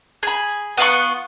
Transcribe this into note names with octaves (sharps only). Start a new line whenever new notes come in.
G#4 B5
B3 F4 F#5 C#6